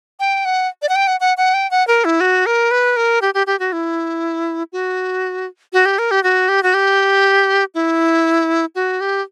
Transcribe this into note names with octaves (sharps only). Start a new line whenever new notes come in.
G5
F#5
D5
F#5
G5
F#5
F#5
F#5
G5
F#5
A#4
E4
F#4
A#4
B4
A#4
G4
G4
G4
F#4
E4
F#4
F#4
G4
A#4
G4
F#4
G4
F#4
G4
E4
F#4
G4